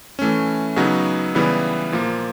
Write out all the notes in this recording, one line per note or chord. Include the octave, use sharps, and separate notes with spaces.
E3 A3 C#4
C#3 F#3 B3 D#4 F#4
C#3 E3 G3 B3 E4
A#2 F3 A#3